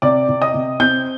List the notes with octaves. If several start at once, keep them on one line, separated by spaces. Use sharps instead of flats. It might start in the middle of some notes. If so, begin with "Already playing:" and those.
C3 D5 D6
C3
D#5 D#6
C3
C4 G6